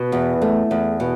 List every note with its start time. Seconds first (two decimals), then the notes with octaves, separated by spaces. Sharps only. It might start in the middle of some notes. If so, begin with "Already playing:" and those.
Already playing: B2
0.12 E2
0.42 A3
0.71 E2
1.00 B2